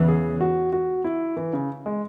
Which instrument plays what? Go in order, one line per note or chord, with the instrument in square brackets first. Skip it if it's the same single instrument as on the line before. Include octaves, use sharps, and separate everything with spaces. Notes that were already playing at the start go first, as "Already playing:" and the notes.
Already playing: [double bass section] E2 C#3 E3
[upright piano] G#4
F#4
F#4
E4
E3
C#3
G#3